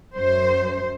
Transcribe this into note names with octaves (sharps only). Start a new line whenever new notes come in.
F#2 C5